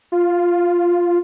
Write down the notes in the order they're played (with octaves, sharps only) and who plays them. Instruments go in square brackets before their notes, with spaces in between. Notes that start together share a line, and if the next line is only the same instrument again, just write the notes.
[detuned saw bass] F4